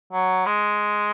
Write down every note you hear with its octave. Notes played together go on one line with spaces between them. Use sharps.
F#3
G#3